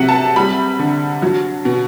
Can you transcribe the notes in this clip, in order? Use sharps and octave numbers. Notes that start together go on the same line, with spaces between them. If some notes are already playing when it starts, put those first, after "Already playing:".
Already playing: C3 F#3 F#5
A5
G3 B5
D3
F#3
B2